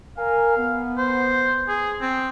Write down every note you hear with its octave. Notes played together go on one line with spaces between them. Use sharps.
A#4 F5 G#5
B3
C5
G#4
C4